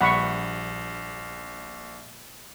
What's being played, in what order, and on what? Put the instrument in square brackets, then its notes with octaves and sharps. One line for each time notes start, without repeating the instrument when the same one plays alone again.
[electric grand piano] A#1 G3 [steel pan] F#5 B5 C#6